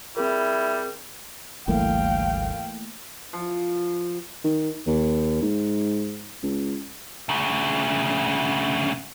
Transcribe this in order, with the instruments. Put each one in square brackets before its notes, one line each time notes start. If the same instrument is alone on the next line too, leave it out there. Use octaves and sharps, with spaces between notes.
[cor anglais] G3 [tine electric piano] C4 G#4 A#4 [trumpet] E4
[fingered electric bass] G#1 D2 G3 [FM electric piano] E3 A3 A#3 [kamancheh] F5 G5
[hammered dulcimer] F3
[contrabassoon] D#3
D#2
G#2
C#2
[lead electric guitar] D2 C#3